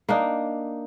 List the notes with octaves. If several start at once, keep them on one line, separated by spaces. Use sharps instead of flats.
A#3 D4 D#4